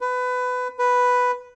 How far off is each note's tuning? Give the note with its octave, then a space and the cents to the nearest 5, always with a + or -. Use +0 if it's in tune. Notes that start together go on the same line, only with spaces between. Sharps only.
B4 +20
B4 +0